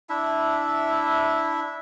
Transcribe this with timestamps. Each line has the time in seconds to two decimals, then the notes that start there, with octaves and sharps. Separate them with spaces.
0.09 D4 E4 E5